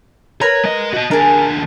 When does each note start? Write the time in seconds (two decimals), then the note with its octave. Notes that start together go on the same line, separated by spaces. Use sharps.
0.41 A#4 B4 C#5 A#5
0.64 G#3 D#5
0.93 F#4 D#5
1.11 D#2 D4 G#4 A#4